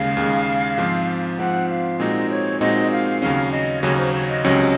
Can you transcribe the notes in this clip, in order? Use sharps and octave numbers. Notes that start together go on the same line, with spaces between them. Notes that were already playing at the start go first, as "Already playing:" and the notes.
Already playing: D#2 C#3 G#3 F5
D#2 C#3 G#3
G#2 F3 C4 F4
G#2 F3 C4 F4 F#5
F5
A#2 G#3 C4 D#4 F#4 D#5
C#5
A#2 G#3 C4 D#4 F#4 D#5
F5
D#2 C#3 F#3 C#4 F5
D#5
D#2 C#3 F#3 C#4 C#5
C5
C#5
D#5
C#2 C3 F#3 C#4